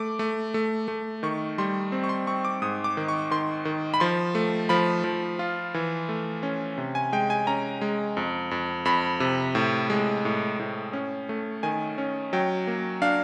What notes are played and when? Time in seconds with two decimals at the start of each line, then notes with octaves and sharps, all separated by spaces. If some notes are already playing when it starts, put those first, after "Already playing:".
Already playing: A3 D6
0.19 A3
0.54 A3
0.88 A3
1.23 D#3 C#6
1.58 G3 C6
1.92 C4
2.04 C#6
2.09 C6
2.27 C4 C#6
2.45 D6
2.62 G#2 D#6
2.84 D6
2.97 D#3
3.08 C#6
3.31 D#3 C6
3.65 D#3
3.94 B5
4.00 F3 C6
4.35 A3
4.69 F3 B5
5.04 F3
5.39 F4
5.74 E3
6.09 A3
6.43 C#4
6.78 C3
6.95 G#5
7.12 G#3 G5
7.30 G#5
7.47 C#4 A#5
7.81 G#3
8.17 F2
8.51 F2
8.85 F2 B5
9.20 C3
9.55 A2
9.90 G#3
10.25 A2
10.59 A2
10.93 C#4
11.29 A3
11.63 D#3 G#5
11.98 C#4
12.33 F#3 G5
12.67 A#3
13.02 D4 F5